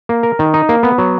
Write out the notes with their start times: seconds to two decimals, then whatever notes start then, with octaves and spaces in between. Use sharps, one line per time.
0.09 A#3
0.23 A#4
0.39 D#3
0.54 D#4
0.69 A#3
0.83 B3
0.98 F#3